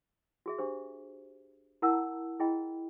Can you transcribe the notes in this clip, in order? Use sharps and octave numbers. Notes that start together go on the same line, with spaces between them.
F#4 G#4 E5
D4 G4 C5
E4 A#4 F#5 A5 A#5 E6
E4 G#4 D#5 G5 B5